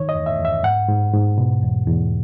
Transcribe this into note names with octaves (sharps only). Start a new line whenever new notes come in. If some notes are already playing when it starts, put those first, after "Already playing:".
Already playing: D#3 C#5
D#5
E2
E5
E2
E5
G#2 F#5
G#2
G#2
B2
E2
E2